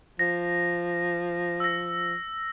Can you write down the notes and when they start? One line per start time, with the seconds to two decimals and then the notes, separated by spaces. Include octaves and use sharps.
0.19 F3 A#6
1.60 E6 A#6